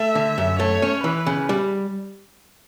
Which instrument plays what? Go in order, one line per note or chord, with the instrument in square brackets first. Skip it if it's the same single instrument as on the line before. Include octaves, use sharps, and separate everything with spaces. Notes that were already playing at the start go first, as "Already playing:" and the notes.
Already playing: [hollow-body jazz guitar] A3 [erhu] E5
[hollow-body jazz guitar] D3
F#2
[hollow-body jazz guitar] A3 [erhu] C#5
[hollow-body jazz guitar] C#4
[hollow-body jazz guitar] E3 [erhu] B4
[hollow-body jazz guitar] C#3
G3